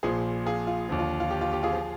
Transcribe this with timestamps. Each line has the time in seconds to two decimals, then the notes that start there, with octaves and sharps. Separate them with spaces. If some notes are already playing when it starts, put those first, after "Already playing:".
0.03 A#1 A#2 F3 G#4 C5
0.46 F4 G#4
0.67 F4
0.89 D#2 D3 F3
0.99 F4
1.20 F4
1.31 G4
1.41 F4
1.53 G4
1.63 F4 G#4
1.73 F3